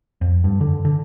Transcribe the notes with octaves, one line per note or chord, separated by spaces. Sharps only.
F2
G2
D3
D3